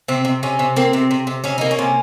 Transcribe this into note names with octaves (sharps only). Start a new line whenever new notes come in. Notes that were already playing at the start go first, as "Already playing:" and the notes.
C3 C4
C3
C3 C#4
C3
A#3 C4
C3
C3
C3
C3 C#4
A#3 D#4
C#4
C3